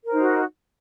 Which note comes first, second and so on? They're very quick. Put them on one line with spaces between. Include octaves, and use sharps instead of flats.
A#4 C5 D#4 F#4